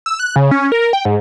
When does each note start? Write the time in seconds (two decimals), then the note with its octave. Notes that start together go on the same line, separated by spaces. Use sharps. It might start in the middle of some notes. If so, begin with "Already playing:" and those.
0.06 E6
0.20 F#6
0.36 C#3
0.51 C#4
0.72 A#4
0.93 G5
1.05 G#2